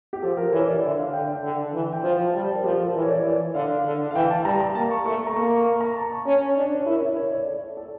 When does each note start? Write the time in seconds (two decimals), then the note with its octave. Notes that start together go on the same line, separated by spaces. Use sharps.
0.13 G4
0.22 F3 A4
0.37 A#4
0.52 E3 C#5
0.68 D5
0.83 D3 E5
0.98 F5
1.13 D3 G5
1.28 G5
1.43 D3
1.73 E3
1.92 G5
2.04 F3 F5
2.18 G5
2.33 G3 A5
2.44 D5
2.54 A#4
2.64 F3 G4
2.79 A4
2.95 E3 A#4
3.02 C#5
3.09 D5
3.24 E3
3.54 D3 F5
3.85 D3
4.11 F5
4.14 E3 G5
4.30 A5
4.45 G3 A#5
4.60 A#5
4.75 A#3 A5
4.91 C#6
5.06 A3 C#6
5.27 A#5
5.36 A#3 C#6
5.66 C#6
5.80 A#5
5.96 A5
6.12 C#6
6.26 C#4 A5
6.56 D4 C#5
6.75 C#5
6.86 E4 A#4
7.02 C#5
7.17 C#5
7.31 D5
7.47 A4
7.77 A4